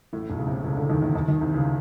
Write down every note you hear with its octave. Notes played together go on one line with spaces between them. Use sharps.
A1 A2
B1 B2
C#3
C2 C3
C#2 C#3
D2 D3
D#2 D#3
E2 E3
D#2 D#3
D#2 D#3
C2 C3
C#2 C#3